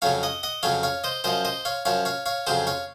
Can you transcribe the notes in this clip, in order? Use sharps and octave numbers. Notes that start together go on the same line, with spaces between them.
F2 C#3 F#3 C#5 F5
D#5 F#5
D#5 F#5
F2 C#3 F#3 C#5 F5
C#5 F5
C5 D#5
F#2 F3 C5 D#5
C5 D#5
C#5 F5
F#2 F3 C#5 F5
C#5 F5
C#5 F5
F2 C#3 F#3 G#4 C5
C#5 F5